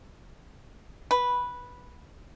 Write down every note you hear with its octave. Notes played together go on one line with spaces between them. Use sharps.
B4